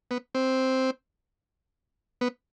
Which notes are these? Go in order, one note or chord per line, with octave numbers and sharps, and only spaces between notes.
B3
C4
B3